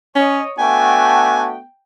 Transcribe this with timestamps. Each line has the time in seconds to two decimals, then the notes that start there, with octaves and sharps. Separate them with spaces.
0.16 C#4 C#5 D#5
0.58 A3 B3 D4 F#4 G5 G#5